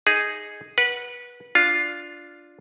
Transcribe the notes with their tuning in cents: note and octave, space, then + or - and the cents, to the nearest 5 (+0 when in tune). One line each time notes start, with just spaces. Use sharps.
D#4 +0 G#4 +0
B4 -20 F#5 +0
D4 +0 F4 +0